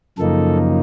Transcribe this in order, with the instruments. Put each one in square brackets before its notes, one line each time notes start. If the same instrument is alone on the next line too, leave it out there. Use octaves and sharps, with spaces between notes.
[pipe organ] F#2 C#3 F3 A#3 D#4 A4